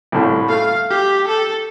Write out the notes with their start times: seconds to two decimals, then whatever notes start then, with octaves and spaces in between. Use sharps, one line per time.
0.12 C2 A2
0.48 A3 F5
0.90 G4
1.28 A4